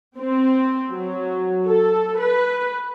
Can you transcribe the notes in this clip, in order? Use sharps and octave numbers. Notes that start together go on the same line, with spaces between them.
C4
F#3
A4
B4